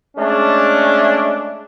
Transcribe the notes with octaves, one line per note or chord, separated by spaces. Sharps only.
G#3 A3 C#4 D4